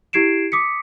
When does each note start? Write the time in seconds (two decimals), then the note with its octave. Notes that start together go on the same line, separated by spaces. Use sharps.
0.13 E4 G4 G#6 C7 D7 E7
0.52 D6 D#6 B6 C#7